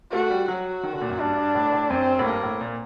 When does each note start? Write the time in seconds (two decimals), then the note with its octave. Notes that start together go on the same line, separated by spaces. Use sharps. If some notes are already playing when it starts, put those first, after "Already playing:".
0.12 A3 F#4
0.31 G3
0.48 F#3 F#4
0.83 D#3
0.93 D3
1.01 A#2
1.10 F#2
1.19 G2 D4
1.37 G2
1.55 A2
1.72 A2
1.90 F#2 C4
2.19 A2
2.26 G2 A#3
2.43 A2
2.61 A#2